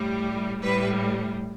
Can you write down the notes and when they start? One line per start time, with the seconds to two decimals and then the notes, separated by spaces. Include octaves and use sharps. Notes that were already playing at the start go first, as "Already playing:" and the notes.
Already playing: A2 G3
0.62 A2 G3 B4